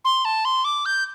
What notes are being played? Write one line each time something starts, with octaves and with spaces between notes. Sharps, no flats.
C6
A5
C6
D6
G6